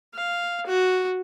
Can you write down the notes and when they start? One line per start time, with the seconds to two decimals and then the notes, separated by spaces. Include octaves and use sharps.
0.14 F5
0.67 F#4